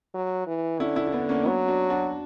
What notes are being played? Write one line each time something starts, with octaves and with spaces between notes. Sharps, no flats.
F#3
E3
D3 C#4 E4
C#4 E4
E4
B3 D4
A#3 C#4
F#3 B3 D4
D4 F#4
D4 F#4